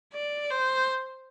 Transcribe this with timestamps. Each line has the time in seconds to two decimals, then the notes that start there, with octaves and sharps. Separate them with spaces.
0.13 D5
0.51 C5